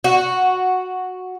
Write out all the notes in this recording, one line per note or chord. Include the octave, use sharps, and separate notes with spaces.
F#4